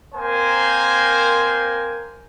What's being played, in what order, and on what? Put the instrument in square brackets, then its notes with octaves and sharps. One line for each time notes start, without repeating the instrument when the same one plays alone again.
[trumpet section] A#3 C4 A#4 C5 G#5